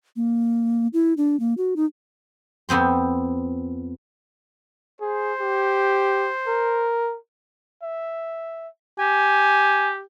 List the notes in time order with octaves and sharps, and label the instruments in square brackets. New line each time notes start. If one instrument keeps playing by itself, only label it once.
[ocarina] A#3
E4
D4
A#3
F#4
D#4
[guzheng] F2 B3 C4 C6
[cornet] G#4 [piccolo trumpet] C5
[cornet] G4
A#4
E5
[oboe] G4 [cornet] G#5